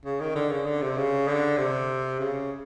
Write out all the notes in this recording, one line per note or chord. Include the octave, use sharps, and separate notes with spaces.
C#3
D#3
D3
C#3
D3
C3
C#3
D3
C3
C#3